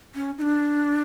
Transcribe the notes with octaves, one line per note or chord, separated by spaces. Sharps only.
C#4
D#4
D4